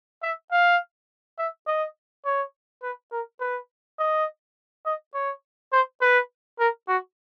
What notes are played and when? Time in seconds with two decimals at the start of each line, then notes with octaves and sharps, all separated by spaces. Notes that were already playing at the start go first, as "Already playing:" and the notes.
0.23 E5
0.51 F5
1.39 E5
1.67 D#5
2.25 C#5
2.82 B4
3.12 A#4
3.40 B4
3.99 D#5
4.85 D#5
5.14 C#5
5.72 C5
6.01 B4
6.59 A#4
6.88 F#4